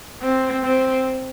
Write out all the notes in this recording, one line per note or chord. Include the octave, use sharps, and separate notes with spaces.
C4
C4